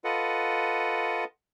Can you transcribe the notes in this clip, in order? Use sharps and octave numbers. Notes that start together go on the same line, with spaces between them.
F4 A4 B4 D#5 F#5